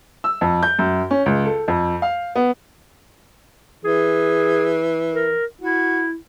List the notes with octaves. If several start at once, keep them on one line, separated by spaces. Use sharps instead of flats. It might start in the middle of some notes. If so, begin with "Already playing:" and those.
E6
F2
G6
F#2
C#4
C#2
A4
F2
F5
B3
E3 G#4
A#4
E4 F#4